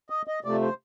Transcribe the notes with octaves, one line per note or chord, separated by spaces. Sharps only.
D#5
D#5
C3 F3 A3 D5
C5